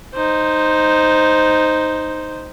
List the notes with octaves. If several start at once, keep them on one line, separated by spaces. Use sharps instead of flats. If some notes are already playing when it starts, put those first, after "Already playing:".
D#4 C5